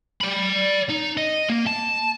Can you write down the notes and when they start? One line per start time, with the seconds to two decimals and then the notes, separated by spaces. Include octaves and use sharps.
0.21 D5 B5
0.89 D#4
1.17 D#5
1.50 A#3
1.67 A5